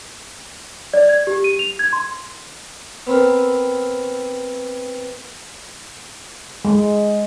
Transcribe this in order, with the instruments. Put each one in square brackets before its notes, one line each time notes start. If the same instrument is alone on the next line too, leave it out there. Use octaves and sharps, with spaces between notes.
[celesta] D5
G#6
G4
D#7
F7
G#6
C6
[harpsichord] B3 C4 A#4
[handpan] G#3